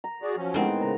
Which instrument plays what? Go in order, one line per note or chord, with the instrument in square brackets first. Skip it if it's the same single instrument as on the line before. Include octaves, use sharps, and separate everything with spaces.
[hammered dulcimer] A#5
[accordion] F#4 G#4 D5
F3 F#3 C#4
[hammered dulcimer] A2 D#3 B3 [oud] G#3 C4
[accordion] C#3 [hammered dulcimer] A#5